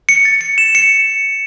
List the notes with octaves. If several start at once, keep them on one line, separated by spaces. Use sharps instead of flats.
C#7
A6
C#7
E7
C#7